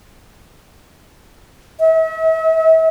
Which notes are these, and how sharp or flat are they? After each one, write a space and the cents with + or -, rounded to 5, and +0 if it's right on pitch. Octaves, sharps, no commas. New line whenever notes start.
E5 -40